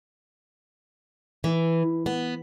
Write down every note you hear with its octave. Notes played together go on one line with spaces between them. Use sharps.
E3
B3